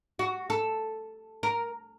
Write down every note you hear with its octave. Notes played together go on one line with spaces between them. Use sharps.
F#4
A4
A#4